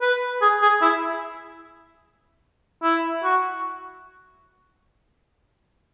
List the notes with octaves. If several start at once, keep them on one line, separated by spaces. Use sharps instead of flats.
B4
G#4
G#4
E4
E4
F#4